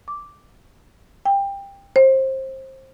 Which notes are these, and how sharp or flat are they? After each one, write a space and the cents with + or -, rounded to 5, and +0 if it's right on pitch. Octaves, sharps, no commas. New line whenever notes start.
D6 -5
G5 +20
C5 +25